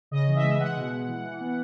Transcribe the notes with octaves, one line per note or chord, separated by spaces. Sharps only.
C#3 D#5
E3
E5
G#3
G#3 F#5
B2
G#3
E3
E3
B3